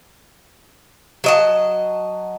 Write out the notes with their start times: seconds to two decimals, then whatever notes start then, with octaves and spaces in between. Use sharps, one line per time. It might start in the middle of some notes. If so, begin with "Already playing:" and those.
1.24 F#3 D#5 A5